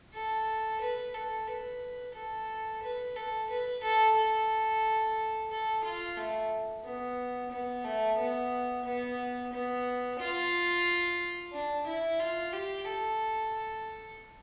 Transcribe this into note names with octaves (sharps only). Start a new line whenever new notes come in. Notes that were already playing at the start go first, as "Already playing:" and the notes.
A4
B4
A4
B4
A4
B4
A4
B4
A4
A4
A4
F4
A3
B3
B3
A3
B3
B3
B3
F4
D4
E4
F4
G4
A4